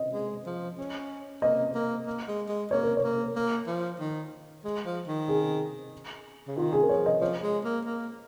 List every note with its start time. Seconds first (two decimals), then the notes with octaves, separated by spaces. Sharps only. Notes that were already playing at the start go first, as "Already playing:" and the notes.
Already playing: D#5
0.13 G#3
0.46 F3
0.78 C#4
1.42 A#3 D#5
1.75 A#3
2.06 A#3
2.28 G#3
2.49 G#3
2.71 A#3 C#5
2.83 A#4
2.97 C#5
3.04 A#3
3.36 A#3
3.67 F3
4.00 D#3
4.64 G#3
4.85 F3
5.07 D#3
5.28 G#4
6.47 C#3
6.57 D#3 F4
6.73 G#4
6.83 A#4
6.89 F3 C#5
7.06 D#5
7.21 F3 C#5
7.43 G#3
7.65 A#3
7.85 A#3